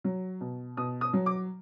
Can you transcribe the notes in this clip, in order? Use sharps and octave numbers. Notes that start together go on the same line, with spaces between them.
F#3
B2
B2 D#6
D#6
F#3
D6